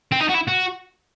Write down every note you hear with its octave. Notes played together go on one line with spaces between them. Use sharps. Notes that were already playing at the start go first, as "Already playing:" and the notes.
C4
D#4
F#4
E4
F#4